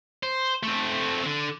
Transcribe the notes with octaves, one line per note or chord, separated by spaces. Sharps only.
C5
A3 C4
D3